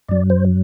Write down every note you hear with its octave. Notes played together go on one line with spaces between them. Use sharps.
F#2 F#3 D5
C5